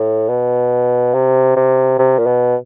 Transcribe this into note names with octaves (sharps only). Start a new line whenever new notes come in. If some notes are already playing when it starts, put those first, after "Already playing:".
Already playing: A2
B2
C3
C3
C3
A#2
B2